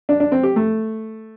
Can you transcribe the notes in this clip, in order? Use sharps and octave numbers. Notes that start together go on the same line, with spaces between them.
D4
D4
C4
G4
A3